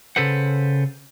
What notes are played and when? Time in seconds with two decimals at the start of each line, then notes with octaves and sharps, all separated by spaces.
0.16 C#3 A4 B4 C5 F#5